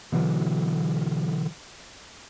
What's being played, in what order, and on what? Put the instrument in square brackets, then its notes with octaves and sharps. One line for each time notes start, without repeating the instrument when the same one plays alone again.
[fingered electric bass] B2 D3 E3 F#3